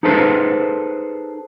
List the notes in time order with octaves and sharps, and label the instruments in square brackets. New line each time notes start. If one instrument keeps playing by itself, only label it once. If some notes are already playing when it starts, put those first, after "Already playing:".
[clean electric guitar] D#4 G#4 A4 B4 C5